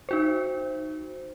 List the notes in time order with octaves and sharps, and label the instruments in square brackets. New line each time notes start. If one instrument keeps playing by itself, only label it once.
[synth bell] D#4 F#4 C5